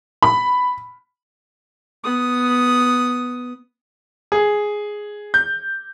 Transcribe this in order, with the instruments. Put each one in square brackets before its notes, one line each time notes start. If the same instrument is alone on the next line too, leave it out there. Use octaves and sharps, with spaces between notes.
[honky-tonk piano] B5
[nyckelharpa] B3 D#6
[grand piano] G#4
G6